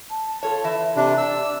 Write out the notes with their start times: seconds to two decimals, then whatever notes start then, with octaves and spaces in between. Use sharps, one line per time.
0.10 A5
0.43 F4 A4 C#5
0.64 E3 E5
0.96 C3 D4 D5
1.18 E6